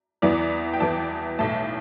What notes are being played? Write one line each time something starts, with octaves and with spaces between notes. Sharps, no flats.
E2 E3 B3 D5
G5
E2 E3 B3 A5
B1 A2 A3 A5